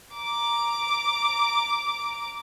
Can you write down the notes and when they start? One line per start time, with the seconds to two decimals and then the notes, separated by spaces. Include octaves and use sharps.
0.14 A#5 D6